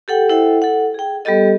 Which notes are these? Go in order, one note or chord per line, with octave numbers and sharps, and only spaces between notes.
G4 A4 F#5 G5
E4 A4 C5 E5 F#5 G5
A4 F#5
G#4 G5
G3 B3 G4 A4 D#5